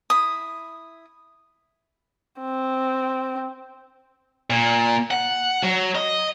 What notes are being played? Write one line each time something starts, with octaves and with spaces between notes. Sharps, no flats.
E4 D#6
C4
A#2
F#5
F#3
D#5